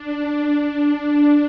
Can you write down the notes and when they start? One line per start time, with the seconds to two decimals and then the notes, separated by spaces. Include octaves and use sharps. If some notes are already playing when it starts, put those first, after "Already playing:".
Already playing: D4
0.45 D4